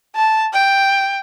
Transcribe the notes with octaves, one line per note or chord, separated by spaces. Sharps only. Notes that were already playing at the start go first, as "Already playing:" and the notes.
A5
G5